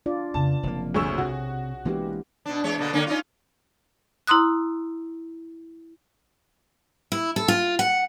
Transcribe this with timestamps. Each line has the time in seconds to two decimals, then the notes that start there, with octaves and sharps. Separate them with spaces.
0.06 D4 F4 D5
0.34 F2 C#3 B3 A5
0.63 F#1 C3 E3 F3 A#3
0.94 D2 G#4 C#5 C#6 E6
1.18 B1 C3 F#4
1.85 E3 G#3 A#3 B3 D4 G4
2.46 B2 D4
2.64 E2 G#3 C#5
2.78 B2 D3 A#3
2.93 D3 A#3 C#4
3.07 C#4 D#4 F4
4.27 E4 A#5 C6 D#6 F#6
7.12 E4
7.36 A4
7.48 F4
7.79 F#5